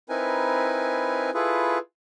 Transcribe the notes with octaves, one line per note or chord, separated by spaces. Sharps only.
C4 D#4 E4 A#4 B4 G#5
E4 F4 G#4 A4 B4